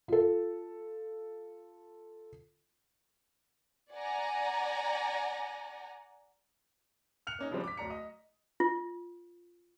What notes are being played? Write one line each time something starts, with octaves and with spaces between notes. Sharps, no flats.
F4 A4
D5 F#5 G#5 A#5
F6 F#6 C#7 F7
A#3 C#4 D#4
C#3 F3 G3 G#3 C4 D4
D6 B6
D1 D5 A#5 C#7
D#5
F4